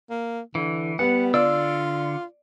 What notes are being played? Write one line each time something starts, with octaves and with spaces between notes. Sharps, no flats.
A#3
D3 E3
G3 B3 F#5
D3 F4 D5 E6